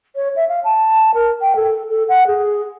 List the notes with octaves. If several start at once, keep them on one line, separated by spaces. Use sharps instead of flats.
C#5
E5
F5
A5
A#4
G5
A4
A4
F#5
G#4